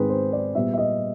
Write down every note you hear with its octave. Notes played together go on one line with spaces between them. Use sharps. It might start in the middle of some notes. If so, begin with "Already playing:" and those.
Already playing: G#2 D#3 G#3 C4 G#4 B4
C5
D5
A#2 G3 B3 E5
E5
D#5